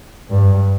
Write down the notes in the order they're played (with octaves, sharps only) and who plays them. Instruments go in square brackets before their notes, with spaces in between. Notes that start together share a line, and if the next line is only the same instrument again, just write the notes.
[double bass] G2